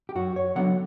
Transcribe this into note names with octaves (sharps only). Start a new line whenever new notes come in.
G4
F#2 F#4
C#5
D3 F#3 B3 F#5